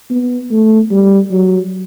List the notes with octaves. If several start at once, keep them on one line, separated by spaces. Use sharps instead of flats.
B3
A3
G3
F#3